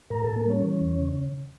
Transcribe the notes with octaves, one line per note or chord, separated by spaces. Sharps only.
A2 A#4 A#5
A2 A4 A5
A#3 A#4
G3 C#4 C#5
E3
E2
C#3